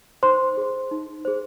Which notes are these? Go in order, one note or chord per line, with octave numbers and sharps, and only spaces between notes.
D#4 C5 C6
G#4 C5
D#4
G#4 C5